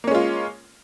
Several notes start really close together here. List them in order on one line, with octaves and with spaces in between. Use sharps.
A#3 C#4 G#3 F4